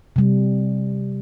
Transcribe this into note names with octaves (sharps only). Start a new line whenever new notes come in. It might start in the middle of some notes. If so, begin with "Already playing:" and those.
C3 G3